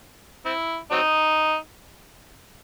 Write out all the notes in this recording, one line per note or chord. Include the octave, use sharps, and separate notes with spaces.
C4 E4
F#3 C4 D#4